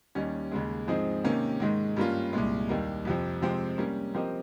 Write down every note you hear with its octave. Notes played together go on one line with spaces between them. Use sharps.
D#2 D#3 G3 C#4
D#2 C#3 G#3
G#2 F3 C4 D#4 G#4
C3 D#3 A#3 C#4 G4
G#2 D#3 G#3
G2 G3 A#3 C#4 F4
C2 A#2 G#3
D#2 D#3 G3 A#3
F2 C3 F3
C3 F3 G#3 C4 G4
G3 A#3 C#4
F3 C4 G4 A#4 D#5